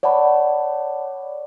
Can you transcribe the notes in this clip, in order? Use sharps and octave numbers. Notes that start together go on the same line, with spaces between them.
C#5 D5 F#5 A5 B5